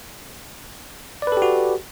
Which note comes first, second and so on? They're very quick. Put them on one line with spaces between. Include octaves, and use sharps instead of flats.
D5 B4 A4 G4 F#4